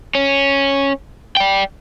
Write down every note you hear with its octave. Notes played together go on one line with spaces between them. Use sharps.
C#4
D5 G5